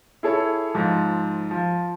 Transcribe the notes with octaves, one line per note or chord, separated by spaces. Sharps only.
E4 G#4 A4 C#5
G#2 F3
F3